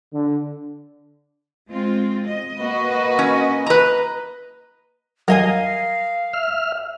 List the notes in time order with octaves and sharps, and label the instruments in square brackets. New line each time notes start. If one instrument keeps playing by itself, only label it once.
[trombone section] D3
[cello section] G#3 C4 F4
D#5
[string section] A#3 F#4 B4
[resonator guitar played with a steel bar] C#4
B4 A#5
[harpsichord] F#3 [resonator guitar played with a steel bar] A#4 D#5 G#5 [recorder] F5
[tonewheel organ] E5 F6